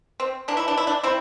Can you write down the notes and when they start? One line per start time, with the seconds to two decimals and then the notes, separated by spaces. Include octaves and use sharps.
0.20 C4
0.48 E3 A#3 D4
0.57 E4
0.68 D4
0.77 E4
0.87 D4
1.03 C4 E4